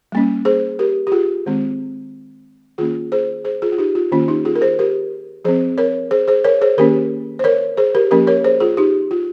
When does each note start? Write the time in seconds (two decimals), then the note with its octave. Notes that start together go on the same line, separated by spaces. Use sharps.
0.12 G3 A#3 C#4
0.45 G#4 C5
0.79 G4 A#4
1.07 G4
1.12 F4 G#4
1.46 D#3 G#3 C4
2.78 D#3 A#3 C#4 F4 G#4
3.12 G#4 C5
3.45 G#4 C5
3.62 F4 G#4
3.72 F4
3.78 D#4 G4
3.95 F4
4.12 D#3 A#3 C#4 F4
4.28 D#4 G4
4.45 F4 G#4
4.56 A#4
4.61 G#4 C5
4.79 G4 A#4
5.45 F3 C4 G#4 C5
5.78 A#4 C#5
6.11 G#4 C5
6.28 G#4 C5
6.44 A#4 C#5
6.61 G#4 C5
6.78 D#3 A#3 C#4 G4 A#4
7.39 C5
7.44 A#4 C#5
7.77 G#4 C5
7.95 G4 A#4
8.11 F3 A#3 C#4 G4 A#4
8.27 A#4 C#5
8.44 G#4 C5
8.60 F4 G#4
8.77 D#4 G4
9.11 F4